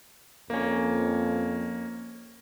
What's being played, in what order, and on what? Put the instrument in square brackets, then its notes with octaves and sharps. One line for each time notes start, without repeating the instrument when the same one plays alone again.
[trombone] F2 [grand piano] A#3 C#4